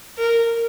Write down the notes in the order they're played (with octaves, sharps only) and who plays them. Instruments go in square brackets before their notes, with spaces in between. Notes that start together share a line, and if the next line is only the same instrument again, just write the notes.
[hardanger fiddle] A#4